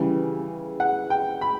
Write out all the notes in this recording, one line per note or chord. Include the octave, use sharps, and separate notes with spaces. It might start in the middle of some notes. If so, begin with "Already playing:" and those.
Already playing: C#3 E3 G3
F#5
G5
B5